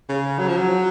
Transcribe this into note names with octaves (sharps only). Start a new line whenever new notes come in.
C#3
F#3
F3
F#3